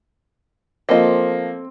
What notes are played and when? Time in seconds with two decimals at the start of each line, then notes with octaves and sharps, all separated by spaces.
0.89 F3 A#3 C4 A4 D#5